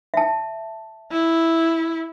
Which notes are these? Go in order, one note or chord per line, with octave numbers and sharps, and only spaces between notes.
E5 A5
E4